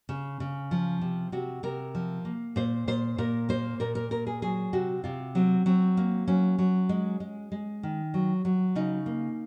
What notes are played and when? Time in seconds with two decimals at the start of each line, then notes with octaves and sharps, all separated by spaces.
0.09 C#3
0.40 C#3
0.71 F3
1.01 C3
1.32 C3 F#4
1.63 C3 A#4
1.95 F3
2.25 A#3
2.56 A#2 C5
2.88 A#2 C5
3.18 A#2 A#4
3.49 A#3 C5
3.80 A#2 A#4
3.95 A#4
4.11 A#2 A#4
4.27 G#4
4.42 F#3 G#4
4.73 C3 F#4
5.04 C3 F4
5.35 F#3 C4
5.66 F#3 C4
5.97 A#3
6.28 F#3 C#4
6.58 F#3
6.89 G#3
7.20 G#3
7.52 G#3
7.83 D#3
8.14 F#3
8.45 F#3
8.76 C#3 D#4
9.06 A#3